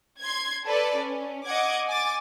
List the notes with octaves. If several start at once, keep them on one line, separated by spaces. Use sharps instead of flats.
C6 G#6
A4 B4 D5
C#4
D#5 F#5 D6 G#6
G#5 D6 A6